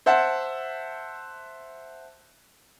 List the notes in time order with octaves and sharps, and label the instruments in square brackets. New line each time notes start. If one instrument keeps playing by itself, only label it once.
[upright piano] C5 E5 F#5 A5